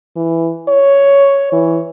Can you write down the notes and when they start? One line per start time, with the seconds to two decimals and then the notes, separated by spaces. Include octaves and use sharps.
0.16 E3
0.69 C#5
1.53 E3